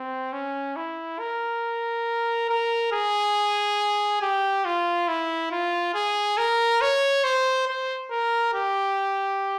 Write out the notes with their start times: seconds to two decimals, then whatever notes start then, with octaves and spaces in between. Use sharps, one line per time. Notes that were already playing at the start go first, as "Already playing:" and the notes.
Already playing: C4
0.33 C#4
0.76 E4
1.20 A#4
2.49 A#4
2.92 G#4
4.22 G4
4.65 F4
5.08 E4
5.52 F4
5.95 G#4
6.38 A#4
6.81 C#5
7.24 C5
7.68 C5
8.11 A#4
8.54 G4